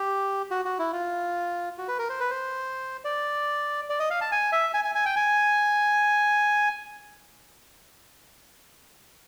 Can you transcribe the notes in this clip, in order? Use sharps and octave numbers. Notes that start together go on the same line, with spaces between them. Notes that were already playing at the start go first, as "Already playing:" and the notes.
Already playing: G4
F#4
F#4
E4
F4
F#4
B4
A#4
C5
B4
C5
D5
D5
D#5
F5
A5
G#5
E5
G#5
G#5
G#5
G5
G#5